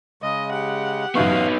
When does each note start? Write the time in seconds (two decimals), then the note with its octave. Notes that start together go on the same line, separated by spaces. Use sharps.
0.22 C#3 G#3 D#5
0.51 G4 F#5
1.15 A1 F#2 B3 D#4 F5 C#6